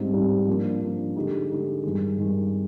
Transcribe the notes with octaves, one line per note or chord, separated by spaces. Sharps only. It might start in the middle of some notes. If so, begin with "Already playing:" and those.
Already playing: G#2 G3 C4 D#4
G#2 G3 C4 D#4
F3 A#3 D4
F3 A#3 D4
D3 G#3 D#4 G4
D3 G#3 D#4 G4
G2 D#3 G#3
G2 D#3 G#3